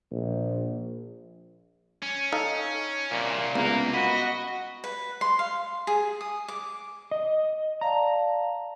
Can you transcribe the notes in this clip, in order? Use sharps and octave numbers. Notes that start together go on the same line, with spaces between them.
A#1
C#4
D#4 A4 F5
C2 A#2
C#2 A#3 B3
F#4 D#5 B5
B4
C6
F5
G#4
D#6
D6
D#5
D5 F5 A5 A#5